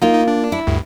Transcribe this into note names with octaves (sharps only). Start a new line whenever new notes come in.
A#3 D#4 F4
D#4
D4
E4
D2 G2